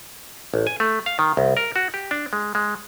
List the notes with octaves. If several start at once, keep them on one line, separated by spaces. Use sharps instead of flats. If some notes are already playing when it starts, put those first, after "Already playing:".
A1
G#5
A3
F5
D#3
C2
A#4
F#4
G4
D4
G#3
G#3